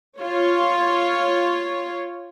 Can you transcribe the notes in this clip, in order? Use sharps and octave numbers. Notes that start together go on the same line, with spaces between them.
F4 C#5